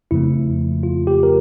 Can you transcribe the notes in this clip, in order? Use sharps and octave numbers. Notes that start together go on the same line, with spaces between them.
F2 C#3 F3 A3 E4
F4
G4
A#4